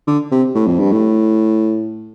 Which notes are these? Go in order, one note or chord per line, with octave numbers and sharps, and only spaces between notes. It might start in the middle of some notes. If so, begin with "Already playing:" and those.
D3
C3
A2
F2
G2
A2